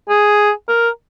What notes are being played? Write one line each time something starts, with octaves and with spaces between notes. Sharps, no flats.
G#4
A#4